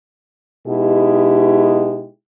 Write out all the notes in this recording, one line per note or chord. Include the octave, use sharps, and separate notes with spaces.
B2 G#3 D#4 E4 G4